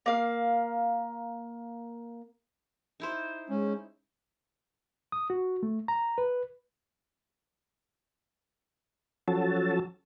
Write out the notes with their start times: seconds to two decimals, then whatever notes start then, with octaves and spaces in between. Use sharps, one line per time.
0.06 A#3 F5
3.00 D#4 E4 C5
3.49 G#3 C#4
5.12 D#6
5.30 F#4
5.63 A3
5.88 A#5
6.18 B4
9.28 F3 F#3 C#4 F#4 A4 A5